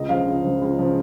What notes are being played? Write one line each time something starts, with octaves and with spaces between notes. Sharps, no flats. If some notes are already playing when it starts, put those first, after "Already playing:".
Already playing: C#2 D#5
C#3 F3 F5
C#2
C#3 F3
C#2
C#3 F3